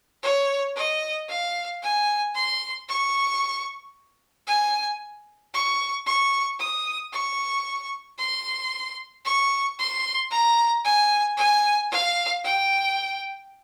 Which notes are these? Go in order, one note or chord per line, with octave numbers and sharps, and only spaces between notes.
C#5
D#5
F5
G#5
C6
C#6
G#5
C#6
C#6
D#6
C#6
C6
C#6
C6
A#5
G#5
G#5
F5
G5